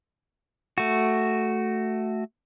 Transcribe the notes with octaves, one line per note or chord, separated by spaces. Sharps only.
A3 F#4